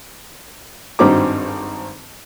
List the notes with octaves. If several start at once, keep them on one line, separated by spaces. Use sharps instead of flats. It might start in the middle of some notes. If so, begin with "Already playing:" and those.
G#1 G2 C4 D#4 F#4 D6